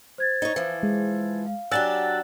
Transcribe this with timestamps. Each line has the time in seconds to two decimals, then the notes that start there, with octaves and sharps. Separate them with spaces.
0.18 C5 G#6 A6
0.42 D#4 C#5
0.56 E3 F3
0.83 G#3
1.46 F5
1.71 F#3 D4 G4 G#5 E6 F#6 A6